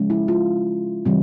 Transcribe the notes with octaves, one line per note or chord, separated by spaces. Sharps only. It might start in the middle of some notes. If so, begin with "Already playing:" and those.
Already playing: C#3 F3 G#3 C#4
E4
F4
C#3 E3 G3 C4